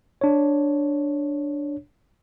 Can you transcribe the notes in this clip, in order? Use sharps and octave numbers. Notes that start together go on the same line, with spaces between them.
D4 C#5